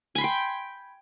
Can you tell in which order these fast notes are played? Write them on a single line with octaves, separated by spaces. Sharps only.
G#5 B5 C6 G5